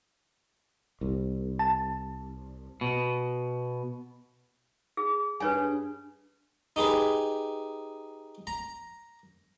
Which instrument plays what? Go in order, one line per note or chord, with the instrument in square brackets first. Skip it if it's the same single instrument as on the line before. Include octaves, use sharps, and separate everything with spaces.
[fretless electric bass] C2
[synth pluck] A5
[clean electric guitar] B2
[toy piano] G#4
[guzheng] G2 G#4 [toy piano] B4 C#5 G#5
[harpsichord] D#4 G4 G#4 B4
A#5